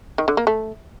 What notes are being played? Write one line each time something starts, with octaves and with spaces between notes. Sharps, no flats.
D#3
D3
A#3
A3